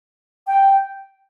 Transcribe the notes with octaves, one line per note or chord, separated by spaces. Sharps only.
G5